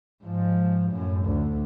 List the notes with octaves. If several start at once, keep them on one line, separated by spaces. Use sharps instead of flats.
G#2 F3
F#2 A2
D2